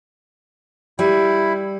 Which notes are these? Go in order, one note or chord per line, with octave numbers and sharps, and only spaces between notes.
G3 E4